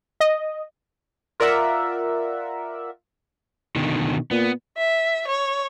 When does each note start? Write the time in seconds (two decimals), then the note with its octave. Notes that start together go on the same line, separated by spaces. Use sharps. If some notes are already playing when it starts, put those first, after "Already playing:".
0.20 D#5
1.40 F4 A#4 D5 E5 F#5
3.76 B2 D3 D#3
4.31 A#2 B3
4.77 E5
5.27 C#5